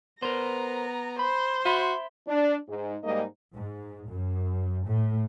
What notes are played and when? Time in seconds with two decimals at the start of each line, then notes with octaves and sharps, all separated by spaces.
0.22 B3 A#4 C5 A#5
1.19 C5 B5
1.65 F#4 E5 B5 C6
2.28 D4
2.68 G#2
3.04 G#2 G3 G#3 A#3 D#4 D#5
3.53 G#2
4.08 F#2
4.86 A2